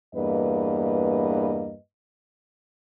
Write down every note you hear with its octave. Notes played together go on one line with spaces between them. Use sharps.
E2 G2 A#3 B4 D#5